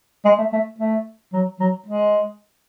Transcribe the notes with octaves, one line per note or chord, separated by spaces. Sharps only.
G#3
A3
A3
A3
F#3
F#3
G#3